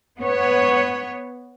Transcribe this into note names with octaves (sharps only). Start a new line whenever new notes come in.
B3 C#5